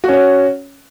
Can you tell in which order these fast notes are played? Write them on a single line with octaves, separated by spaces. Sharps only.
F#4 C#4 C#5